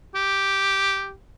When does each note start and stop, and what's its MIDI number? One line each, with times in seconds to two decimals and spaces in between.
0.15 1.13 67